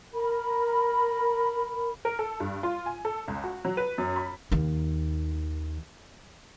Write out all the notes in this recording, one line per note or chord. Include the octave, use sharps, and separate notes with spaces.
A#4 B5
A#4
A4
G2
F4
G#5
A4
C#2
F#4
F#3
B4
F#2
B5
D#2 D#3